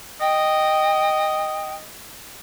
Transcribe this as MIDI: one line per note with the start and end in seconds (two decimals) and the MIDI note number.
0.21 1.88 75
0.21 1.74 79